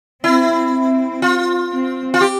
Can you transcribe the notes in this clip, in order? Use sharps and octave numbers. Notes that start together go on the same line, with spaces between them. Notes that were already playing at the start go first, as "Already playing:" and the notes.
C4 E4
C4
F4
C4
F4
G4